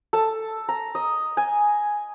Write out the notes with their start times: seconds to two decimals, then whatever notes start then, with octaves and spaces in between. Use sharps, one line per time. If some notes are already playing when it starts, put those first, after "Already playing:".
0.13 A4 A5
0.69 A#5
0.95 D#5
1.37 G#5